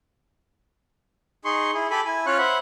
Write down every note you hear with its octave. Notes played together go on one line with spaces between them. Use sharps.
D#4 G#4 C6 C#6
E4 G#4
G4 A4 G#5 B5
E4 G#5
C#4 F4 C#5 F5 C#6 F#6
C5 E5 F#5 B5